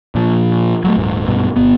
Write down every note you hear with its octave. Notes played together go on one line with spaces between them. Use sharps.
A#2 F3
F#3 G#3 A3
D#1 G#2
B1 G2 B2
G1 B3